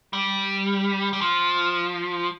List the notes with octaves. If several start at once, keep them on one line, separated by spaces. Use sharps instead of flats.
G3
G3
F3